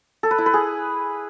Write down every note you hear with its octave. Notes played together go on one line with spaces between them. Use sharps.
A4
B4
E4
B4
G#4